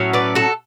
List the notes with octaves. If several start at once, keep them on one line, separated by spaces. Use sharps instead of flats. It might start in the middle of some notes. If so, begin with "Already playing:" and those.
Already playing: A2 F#3 C#4
B4 D5
F#4 A4